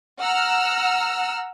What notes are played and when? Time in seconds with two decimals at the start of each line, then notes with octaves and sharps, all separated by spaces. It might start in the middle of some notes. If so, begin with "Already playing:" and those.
0.19 F#5 A#5 E6 F6